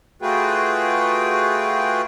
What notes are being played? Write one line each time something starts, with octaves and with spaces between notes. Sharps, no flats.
A3 F4 F#4 G#4 B4 G5